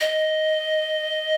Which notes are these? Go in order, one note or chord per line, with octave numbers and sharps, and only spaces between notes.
D#5